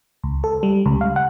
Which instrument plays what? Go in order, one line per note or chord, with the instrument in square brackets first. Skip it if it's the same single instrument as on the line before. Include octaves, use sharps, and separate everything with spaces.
[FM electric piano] C#2
A4
G3
C#2
F5
F#5